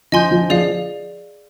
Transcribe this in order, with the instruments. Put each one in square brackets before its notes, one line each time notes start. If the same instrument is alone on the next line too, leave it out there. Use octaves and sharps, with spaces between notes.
[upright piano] F3 [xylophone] D#5 G#5 C6 G6
[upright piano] F3
[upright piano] F3 [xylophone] G#4 D5 F5